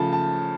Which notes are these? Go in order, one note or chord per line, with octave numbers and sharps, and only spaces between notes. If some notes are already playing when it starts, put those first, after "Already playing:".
Already playing: C#3 F3 A3 A5
A5